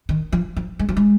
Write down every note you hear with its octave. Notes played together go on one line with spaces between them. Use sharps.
D#3
F3
F3
G#3
F3
G#3